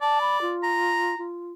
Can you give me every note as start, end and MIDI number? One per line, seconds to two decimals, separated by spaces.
0.02 0.54 74
0.02 0.19 81
0.21 0.40 83
0.42 1.18 65
0.63 1.24 82
1.18 1.53 65